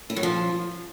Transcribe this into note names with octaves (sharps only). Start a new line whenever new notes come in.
E4
F#3
F3